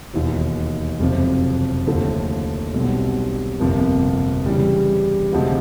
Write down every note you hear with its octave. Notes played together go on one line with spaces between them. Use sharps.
E1 D#2 D#3
F#1 F2 C3 F3
D#2 D3 F3 A3
B1 B2 G3 C4
G1 F2 C3 F3 A#3
C#3 E3 G3
D2 C3 F3 G#3